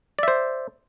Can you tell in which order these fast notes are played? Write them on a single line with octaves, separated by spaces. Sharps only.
D5 E5 C5